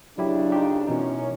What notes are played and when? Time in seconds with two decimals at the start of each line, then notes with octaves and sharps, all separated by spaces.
0.18 D2 C#3 F#3 D4 E4 G4
0.52 D#4 F4 G4
0.87 F#2 B2 E3 C#4 D#4